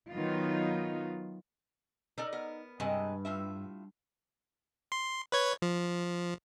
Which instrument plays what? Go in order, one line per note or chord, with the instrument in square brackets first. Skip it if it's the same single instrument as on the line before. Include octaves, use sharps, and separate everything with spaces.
[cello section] D#3 F#3 B3 D#4 F4
[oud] D#4 [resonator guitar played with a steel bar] A4 A#4 D5
[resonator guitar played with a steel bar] B3 A#4
[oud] G2 [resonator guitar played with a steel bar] C3 G#3 D#5
[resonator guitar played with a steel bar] A2 F4 E5
[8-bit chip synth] C6
B4 C#5 G#6
F3